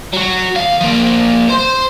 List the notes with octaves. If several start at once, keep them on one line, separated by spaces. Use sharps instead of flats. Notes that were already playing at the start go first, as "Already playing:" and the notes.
F#3 F#4
D#2 F5
F3 A#3
C5 C6